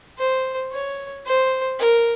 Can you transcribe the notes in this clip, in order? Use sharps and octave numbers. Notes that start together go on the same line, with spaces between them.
C5
C#5
C5
A#4